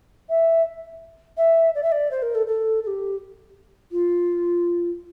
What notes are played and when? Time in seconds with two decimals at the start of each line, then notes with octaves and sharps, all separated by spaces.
0.30 E5
1.37 E5
1.75 D5
1.83 E5
1.92 D5
2.11 C5
2.22 A#4
2.35 A4
2.47 A4
2.83 A4
2.87 G4
3.92 F4